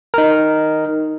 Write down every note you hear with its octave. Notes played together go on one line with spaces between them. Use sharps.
D#4 A#4